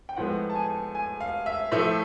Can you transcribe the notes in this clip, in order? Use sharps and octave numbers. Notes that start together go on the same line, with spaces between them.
G5
A2 F3 G#3 B3 F#5
A5
G#5
G#5
F5
E5
A2 F3 A3 E5